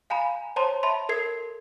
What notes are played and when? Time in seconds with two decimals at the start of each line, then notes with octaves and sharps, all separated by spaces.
0.10 F5 G#5 A#5 B5
0.56 C5 C#5 A5 A#5 C6
0.83 E5 A5 B5 C6
1.09 A4 A#4 G#6 C7